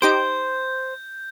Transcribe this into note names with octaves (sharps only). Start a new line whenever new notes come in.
D#4 G4 C5 G6 D7